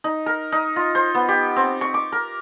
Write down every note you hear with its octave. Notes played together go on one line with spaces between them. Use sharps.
D#4
A#4
D#4
F4
C5
B3
G4
C4
C#6
D6
A#4